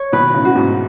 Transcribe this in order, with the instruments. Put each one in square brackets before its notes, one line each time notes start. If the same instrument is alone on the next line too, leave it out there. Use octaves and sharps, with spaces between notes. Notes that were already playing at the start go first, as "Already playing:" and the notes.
Already playing: [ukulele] C#5
[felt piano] B2 D#3 [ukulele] B4
[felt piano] A2 C#3
[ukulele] F#4
[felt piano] G#2 B2